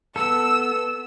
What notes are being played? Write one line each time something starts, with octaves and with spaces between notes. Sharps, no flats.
B3 A4 E6